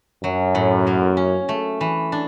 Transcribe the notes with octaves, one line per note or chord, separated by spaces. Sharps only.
F#2 F#3
A2
A#3
C#4
A3
E3
D4